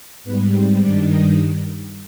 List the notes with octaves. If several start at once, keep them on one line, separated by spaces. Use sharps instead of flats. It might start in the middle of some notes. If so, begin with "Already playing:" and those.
G#2 G3 B3 B4
C4 C5
G2 D#3 G3 D4 D5
D#4 D#5